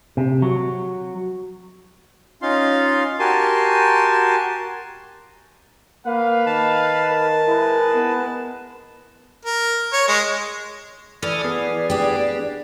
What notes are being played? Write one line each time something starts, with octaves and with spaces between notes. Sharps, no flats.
C3
F#3
C#4 D#4 F4 F5 C6
F#4 G4 A#4 G#5 A5 C6
A#3 B4 F5
D#3 A5
A#4
G#3 E4 B4
B3
A#4
C#5
G#3
E3 A4 D5 D#6 F6
B3 G#4
D4 G4